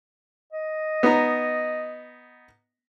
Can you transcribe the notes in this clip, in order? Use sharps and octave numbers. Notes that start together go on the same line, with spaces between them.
D#5
B3 D#4 A#5